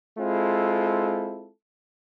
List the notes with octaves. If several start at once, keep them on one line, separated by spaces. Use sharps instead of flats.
G#3 C4 E4 F4 A4